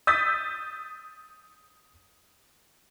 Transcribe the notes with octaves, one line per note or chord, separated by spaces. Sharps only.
D#6 E6 G6 A6 B6